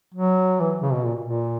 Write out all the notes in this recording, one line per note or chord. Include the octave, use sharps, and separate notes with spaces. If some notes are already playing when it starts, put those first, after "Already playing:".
F#3
E3
C#3
B2
A#2
A#2